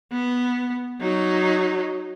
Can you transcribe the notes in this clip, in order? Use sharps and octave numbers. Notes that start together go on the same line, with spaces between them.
B3
F#3 D#4